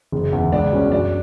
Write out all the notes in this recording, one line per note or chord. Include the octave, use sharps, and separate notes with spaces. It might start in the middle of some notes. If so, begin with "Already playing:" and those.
F#1
E2 C#3
C#2 D4
B2 G3 C#4 F#4
F#2 D4